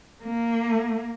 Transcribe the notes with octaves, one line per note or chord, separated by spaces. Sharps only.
A#3